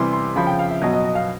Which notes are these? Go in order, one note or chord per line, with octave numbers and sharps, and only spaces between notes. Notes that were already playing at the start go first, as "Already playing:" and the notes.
Already playing: C3 E3 G3 C6
C6
C#3 F3 B5
G5
F5
E5
B2 F#3 D#5
D#5
D#5
F5